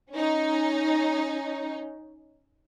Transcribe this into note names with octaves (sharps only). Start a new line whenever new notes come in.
C#4 D#4